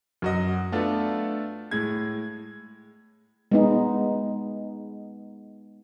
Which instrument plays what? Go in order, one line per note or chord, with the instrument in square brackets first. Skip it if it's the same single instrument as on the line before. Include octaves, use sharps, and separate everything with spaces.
[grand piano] F#2 F#4 D#5
A3 B3 D4 F4 A4
A2 G#3 G#6
[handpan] G#3 B3 D#4